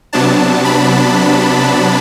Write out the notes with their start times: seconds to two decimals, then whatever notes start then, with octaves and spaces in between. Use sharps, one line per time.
0.13 C3 F#3 B3 D4 A5
0.65 B5